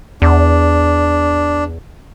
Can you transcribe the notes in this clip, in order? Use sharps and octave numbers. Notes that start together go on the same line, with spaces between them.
E2 D4